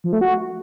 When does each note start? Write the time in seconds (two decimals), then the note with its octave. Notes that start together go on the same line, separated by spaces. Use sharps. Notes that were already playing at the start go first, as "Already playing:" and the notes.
0.04 F3
0.13 A3
0.21 F#4